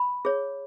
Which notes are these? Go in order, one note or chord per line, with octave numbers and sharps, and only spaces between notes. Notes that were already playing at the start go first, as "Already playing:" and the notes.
Already playing: B5
G#4 C#5